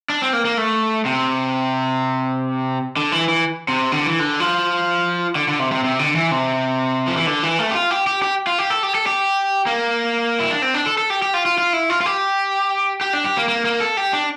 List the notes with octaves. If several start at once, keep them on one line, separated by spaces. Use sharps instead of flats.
D4
C4
A#3
A#3
A3
C3
D3
E3
E3
C3
D3
E3
D3
F3
D3
D3
C3
C3
C3
D3
E3
C3
F3
E3
D3
E3
A3
G4
F4
G4
G4
G4
F4
G4
A4
G4
A4
G4
A#3
E4
D4
C4
D4
A4
A4
G4
G4
F4
F4
F4
E4
F4
F4
G4
G4
D4
G4
A#3
A#3
A#3
A4
G4
D4